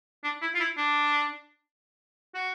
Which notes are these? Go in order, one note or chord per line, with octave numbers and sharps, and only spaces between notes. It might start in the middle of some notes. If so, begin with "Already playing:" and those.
D4
E4
F4
E4
D4
F#4